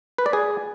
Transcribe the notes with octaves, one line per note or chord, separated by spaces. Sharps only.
B4
D5
G#4